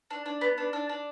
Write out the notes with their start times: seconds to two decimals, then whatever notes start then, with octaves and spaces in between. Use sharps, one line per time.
0.11 D4
0.26 D4
0.41 B3
0.58 D4
0.73 D4
0.89 D4